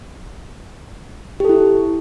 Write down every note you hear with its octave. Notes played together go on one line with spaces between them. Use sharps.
E4 G4 A4